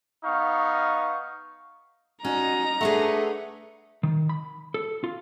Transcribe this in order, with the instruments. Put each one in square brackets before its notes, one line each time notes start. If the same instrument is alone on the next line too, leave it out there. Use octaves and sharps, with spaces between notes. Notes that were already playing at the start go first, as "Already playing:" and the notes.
[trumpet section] B3 D#4 F5 C#6
[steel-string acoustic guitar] C#4 [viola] D#4 [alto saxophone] F#4 [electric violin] A#5
[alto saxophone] A3 [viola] D4 A4 [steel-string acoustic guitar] G#4 B4 F#5
[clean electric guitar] D#3
B5
A4
F4